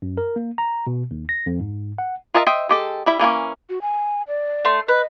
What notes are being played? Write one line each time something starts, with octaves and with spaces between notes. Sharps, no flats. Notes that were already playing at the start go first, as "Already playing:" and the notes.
F#2
A#4
A#3
A#5
B2
D#2
A#6
F2
G#2
F#5
F4 A#4 D#5 E5 A5
C5 D#5 E5 G5
G#3 G4 A4
G3 E4 E5
E3 A#3 B3 C#4
F#4
G#5
D5
A3 C6
B4 D#5